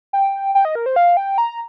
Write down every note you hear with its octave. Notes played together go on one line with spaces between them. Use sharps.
G5
G5
D#5
A#4
C5
F5
G5
A#5